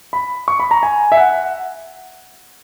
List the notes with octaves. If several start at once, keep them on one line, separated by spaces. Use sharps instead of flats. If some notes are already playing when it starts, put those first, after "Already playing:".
B5
C#6
B5
A#5
G#5
E5
F#5